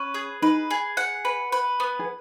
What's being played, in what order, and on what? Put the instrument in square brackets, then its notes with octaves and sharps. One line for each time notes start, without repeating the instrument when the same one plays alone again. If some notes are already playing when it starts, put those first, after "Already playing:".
Already playing: [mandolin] C#4 B4
G#4
[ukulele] D#4 [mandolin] B4
[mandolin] G#4
F#5
B4
B4
B3
[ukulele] G#4